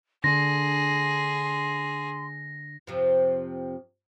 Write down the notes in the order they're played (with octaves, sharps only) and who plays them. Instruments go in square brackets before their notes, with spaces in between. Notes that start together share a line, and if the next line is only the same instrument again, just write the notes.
[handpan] D3 D4 [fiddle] G#4 [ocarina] C6 [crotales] A#6
[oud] F2 C3 F3